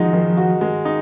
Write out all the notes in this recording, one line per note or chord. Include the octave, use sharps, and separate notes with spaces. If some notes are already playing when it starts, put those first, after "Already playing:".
Already playing: D#3 F3 G#3 D#4 F#4
D#3
F#4
G#3
D#4